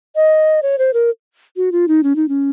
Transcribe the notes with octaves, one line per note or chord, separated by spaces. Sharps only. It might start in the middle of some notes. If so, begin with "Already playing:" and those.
D#5
C#5
C5
A#4
F#4
F4
D#4
C#4
D#4
C#4